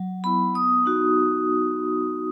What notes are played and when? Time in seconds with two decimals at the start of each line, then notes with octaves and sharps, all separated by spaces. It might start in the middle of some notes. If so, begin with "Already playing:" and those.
Already playing: F#3
0.24 B3 E4 B5
0.54 B3 D#6
0.86 D#4 F#4